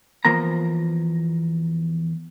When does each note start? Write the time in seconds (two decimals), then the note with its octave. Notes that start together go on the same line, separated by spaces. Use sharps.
0.25 E2 F3 A#3 A#5